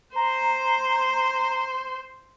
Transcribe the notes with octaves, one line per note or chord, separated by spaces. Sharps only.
C5 A#5